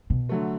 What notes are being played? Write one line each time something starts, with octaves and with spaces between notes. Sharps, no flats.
B2
D3 F#3 A3